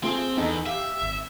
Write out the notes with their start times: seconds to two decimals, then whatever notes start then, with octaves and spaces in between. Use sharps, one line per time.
0.04 A3 C4 F4 G#4
0.37 E2 B3 D#4 A4
0.66 G4 E5 F5
1.02 G#1